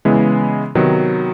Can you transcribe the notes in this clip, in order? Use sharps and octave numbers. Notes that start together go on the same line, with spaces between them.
C#3 E3 G#3 B3 E4
C3 D#3 F#3 B3